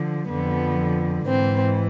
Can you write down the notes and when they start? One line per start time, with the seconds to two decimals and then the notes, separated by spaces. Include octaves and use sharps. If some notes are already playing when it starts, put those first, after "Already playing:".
Already playing: D3 F3
0.28 F2 D3 F3 B3
1.27 G#2 E3 C4